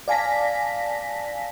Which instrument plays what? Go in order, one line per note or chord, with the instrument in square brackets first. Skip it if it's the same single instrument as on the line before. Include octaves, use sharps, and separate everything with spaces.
[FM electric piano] D5 F5 G#5 A5 A#6 B6